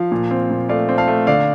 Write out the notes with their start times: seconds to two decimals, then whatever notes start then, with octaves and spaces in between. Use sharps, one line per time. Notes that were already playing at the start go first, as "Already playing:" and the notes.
Already playing: F3 F5
0.12 A#2
0.31 C4
0.50 A#2
0.69 A3 D5 F5
0.89 C4
0.98 F5 A5
1.08 A3
1.27 D3 D5 F5